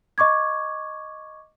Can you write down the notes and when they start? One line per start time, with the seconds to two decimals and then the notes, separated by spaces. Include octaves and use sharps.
0.18 D#5 C#6 D6 G#6